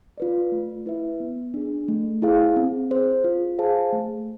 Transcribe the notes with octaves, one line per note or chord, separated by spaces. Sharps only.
F4 B4 D5
A3
E4 B4 E5
B3
D4 G#4
A3
E4 G#4 C5 F5
C4
G#4 C5
F4
G#4 C5 F5 A5
A3